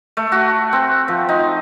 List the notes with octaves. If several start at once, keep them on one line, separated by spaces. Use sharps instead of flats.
A3
F#4
C4
F3
D#4